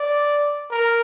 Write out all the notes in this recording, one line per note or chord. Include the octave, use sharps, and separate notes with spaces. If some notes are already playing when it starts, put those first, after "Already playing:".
Already playing: D5
A#4